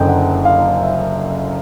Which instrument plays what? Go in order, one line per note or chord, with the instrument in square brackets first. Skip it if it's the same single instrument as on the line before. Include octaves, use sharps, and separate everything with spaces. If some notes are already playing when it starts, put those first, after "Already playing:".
Already playing: [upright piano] F#1 F#2 D3 G5
F#5
F5
E5